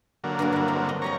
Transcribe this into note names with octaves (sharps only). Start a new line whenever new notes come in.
D3 F#3 A#3
G2 G#4 A#4
G3 E4
C4
D#5
F2 G4 C#5 D#5 A#5